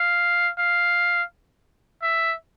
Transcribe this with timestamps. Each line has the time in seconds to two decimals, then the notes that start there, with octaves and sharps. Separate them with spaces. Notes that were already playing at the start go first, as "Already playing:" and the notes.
Already playing: F5
0.58 F5
2.02 E5